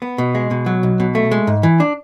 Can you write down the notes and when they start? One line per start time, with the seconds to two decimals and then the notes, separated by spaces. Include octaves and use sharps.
0.02 B3
0.18 B2
0.35 G#3
0.51 B2
0.66 F#3
0.83 B1
1.00 B2
1.15 A3
1.31 G#3
1.47 G#2
1.63 E3
1.80 D4